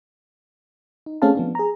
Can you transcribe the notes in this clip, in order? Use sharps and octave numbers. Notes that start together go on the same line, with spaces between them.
D#4
A3 C4 C#4 G#4 F5 A5
F3 B3 D4
G#4 A#5